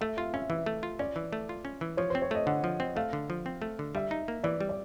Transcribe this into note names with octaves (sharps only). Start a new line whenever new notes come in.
A3 E5
F4 F5
C#4 E5
E3 E5
A3
F4
C#4 D5
E3
A3
F4
C#4
E3
F3 C#5
C4 C5
C#5
A3 D#5
D3 F#5
F3
C4
A3 F5
D3
F3
C4
A3
D3
G3 E5
D#4
A#3
E3 D5
G3
D5